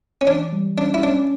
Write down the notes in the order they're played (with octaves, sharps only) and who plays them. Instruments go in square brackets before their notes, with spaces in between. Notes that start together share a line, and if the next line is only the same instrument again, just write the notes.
[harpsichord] C#4
[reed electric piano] E3 [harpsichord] D4
[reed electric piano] G3
[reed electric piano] C#4 [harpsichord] D4
[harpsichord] E4
[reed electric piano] C#4 [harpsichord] D4